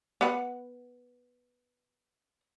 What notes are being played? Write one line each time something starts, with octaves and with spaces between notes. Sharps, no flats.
B3 F#5